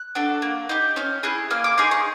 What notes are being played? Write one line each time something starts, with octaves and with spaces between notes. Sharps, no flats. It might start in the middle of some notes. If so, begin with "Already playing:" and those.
Already playing: F#6
D4 F#4 A4
A#3
D#4 G4
C#4 F6
E4 G#4 F#6
A#3 F6
D6
D#4 G#4 C6
C#6